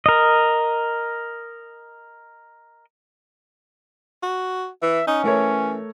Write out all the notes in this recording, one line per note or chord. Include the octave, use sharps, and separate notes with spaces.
A#4 D#5
F#4
E3 E5
C#4 D#4
E3 A3 A#4 C#5